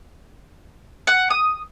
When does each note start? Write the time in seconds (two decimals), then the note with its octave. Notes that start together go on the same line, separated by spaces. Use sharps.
1.07 F#5
1.30 D#6